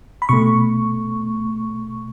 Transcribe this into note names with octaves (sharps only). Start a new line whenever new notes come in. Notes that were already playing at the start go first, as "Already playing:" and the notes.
B5
B2 A3 C#6